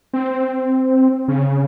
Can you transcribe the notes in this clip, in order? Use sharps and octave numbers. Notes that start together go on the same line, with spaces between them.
C4
C#3